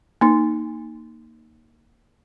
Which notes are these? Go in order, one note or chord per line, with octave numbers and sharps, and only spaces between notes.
A#3 D#4